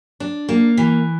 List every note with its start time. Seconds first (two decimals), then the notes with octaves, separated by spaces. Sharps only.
0.20 D4
0.49 A#3
0.77 E3